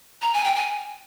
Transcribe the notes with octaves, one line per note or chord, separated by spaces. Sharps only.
A#5
G#5
G5
G#5